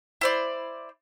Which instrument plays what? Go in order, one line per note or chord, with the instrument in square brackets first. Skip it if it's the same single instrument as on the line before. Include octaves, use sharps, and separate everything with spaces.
[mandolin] E4 C5 D5